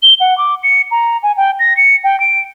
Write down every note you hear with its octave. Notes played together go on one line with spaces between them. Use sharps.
G7
F#5
D6
C#7
A#5
G#5
G5
A#6
C#7
G5
D7